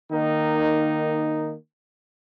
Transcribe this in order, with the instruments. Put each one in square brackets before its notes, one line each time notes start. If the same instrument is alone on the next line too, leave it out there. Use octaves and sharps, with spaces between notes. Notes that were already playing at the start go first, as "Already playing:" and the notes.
[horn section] D#3 A#3 D#4